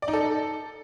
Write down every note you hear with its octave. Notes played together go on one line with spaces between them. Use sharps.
D5
D#4
A4